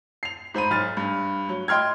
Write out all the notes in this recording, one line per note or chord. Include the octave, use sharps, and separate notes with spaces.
C7 F7
G#2 C5 B5 D#7
B1 F6 A6
G2
F#3
D#5 G5 C6 F6 G#6